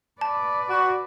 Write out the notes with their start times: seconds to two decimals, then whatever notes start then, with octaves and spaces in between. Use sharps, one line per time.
0.21 B4 D5 A5
0.70 F#4